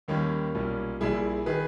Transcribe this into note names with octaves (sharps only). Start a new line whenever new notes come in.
D#2 D#3 G3 A#3 C#4
B1 A#2 G3
A#1 A#2 G3 E4 G#4
D#3 G#4 B4